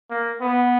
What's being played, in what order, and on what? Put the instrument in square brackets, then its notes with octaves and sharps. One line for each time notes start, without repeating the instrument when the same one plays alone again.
[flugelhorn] A#3
B3